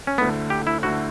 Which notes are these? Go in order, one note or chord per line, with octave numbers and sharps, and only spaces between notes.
C#4
D2 D3 A3 B3 E4
G4
E4
D2 D3 A3 E4 F#4